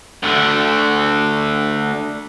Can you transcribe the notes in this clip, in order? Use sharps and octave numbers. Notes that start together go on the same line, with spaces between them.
D2 D3